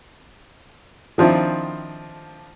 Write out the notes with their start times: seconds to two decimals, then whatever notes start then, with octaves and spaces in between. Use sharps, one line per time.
1.18 D#3 F3 C4 D4 E4